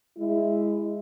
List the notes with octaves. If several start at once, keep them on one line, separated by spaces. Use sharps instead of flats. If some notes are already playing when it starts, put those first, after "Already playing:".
G#3 E4